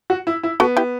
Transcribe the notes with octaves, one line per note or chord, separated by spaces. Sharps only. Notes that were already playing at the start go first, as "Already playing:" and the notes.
F#4
E4
E4
B3 F#4 A4
E4 G4